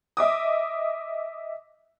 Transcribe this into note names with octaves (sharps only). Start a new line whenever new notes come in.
D#5 E5 D6 D#6